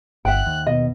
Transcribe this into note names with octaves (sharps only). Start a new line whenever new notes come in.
G1 E5 F#5 G5 F#6
D#2
B2 D#5